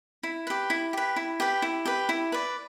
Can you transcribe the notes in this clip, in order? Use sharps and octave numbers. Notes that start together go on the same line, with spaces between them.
E4
G4 B4
E4
G4 B4
E4
G4 B4
E4
G4 B4
E4
B4 D5